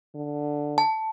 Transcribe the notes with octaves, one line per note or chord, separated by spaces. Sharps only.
D3
A5